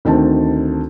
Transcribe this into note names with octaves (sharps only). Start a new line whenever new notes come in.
D2 D#3 C4 D#4 A5